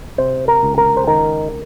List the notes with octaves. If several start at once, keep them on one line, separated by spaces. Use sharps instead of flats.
C3 C5
A#4
C#2
A#4
C5
D#3 A#4